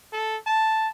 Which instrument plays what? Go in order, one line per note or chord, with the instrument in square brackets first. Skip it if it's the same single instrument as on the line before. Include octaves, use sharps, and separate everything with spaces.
[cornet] A4
A5